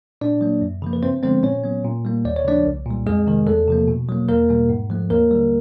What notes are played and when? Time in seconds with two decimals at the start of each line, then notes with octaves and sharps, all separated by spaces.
0.21 A#2 D4 D5
0.41 F#3 A#3
0.61 F#2
0.82 C#3 F3 A#3
0.93 B4
1.03 G2 C4 C5
1.23 D3 F3 G#3 B3 C4 C5
1.43 A#2 C#4 C#5
1.64 F#3 B3
1.84 A#2
2.05 G3 A#3
2.25 D#2 D5
2.36 C#5
2.45 C#3 F3 A3 D4 D5
2.65 C2
2.86 A#2 G3
3.06 F2 G#3 G#4
3.27 C3 D#3 G#3
3.47 E2 A3 A4
3.67 C3 F3 A#3
3.88 B2
4.09 F#3 A#3
4.28 E2 A#3 A#4
4.49 B2 G3 A#3
4.69 G#2
4.90 F3 A3
5.10 D#2 A#3 A#4
5.31 D3 G3